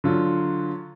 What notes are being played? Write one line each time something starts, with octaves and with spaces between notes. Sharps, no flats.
D3 F#3 F4